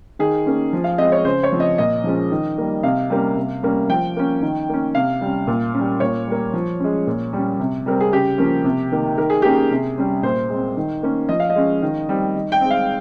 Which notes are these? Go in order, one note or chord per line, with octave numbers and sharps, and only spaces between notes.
D#3 G#4
A#3 C#4
F3
F5
G#3 C4 D#5
C#5
C#3 C5
C#5
F3 C4
D#5
A#2 D#5
F3 G#3 C#4
D#3
G3 A#3
C3 F5
G3 A#3 C#4
C3
G3 A#3 C#4
F3 G5
A#3 C#4
D#3
A#3 C#4
C3 F5
G3 C#4
A#2
C#4
G3
A#2 C#5
G3 A#3
F3
G#3 C#4
A#2
G3 C#4
C3
G3 C4 A#4
G#4
C#3 G4
F3 A#3 C#4
C3
D#3 A#3
D#3 A#4
G#4
A#3 C#4 G4
G#4
C3
G3 C#4
A#2 C5
G#3 C4
D#3
A#3 C#4
F3 D#5
F5
D#5
G#3 C#4
D#3
G3 C4
D#3
G5
G#3 C4
F5